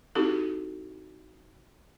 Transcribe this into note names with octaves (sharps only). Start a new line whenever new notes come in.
C4 D#4 E4 F#4 G4 A4